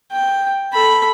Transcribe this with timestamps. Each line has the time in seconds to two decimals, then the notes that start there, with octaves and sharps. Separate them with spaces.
0.12 G5
0.73 A4 B5